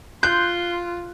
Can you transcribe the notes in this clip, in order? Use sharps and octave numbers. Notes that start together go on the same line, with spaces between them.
F4 C6 F#6 G6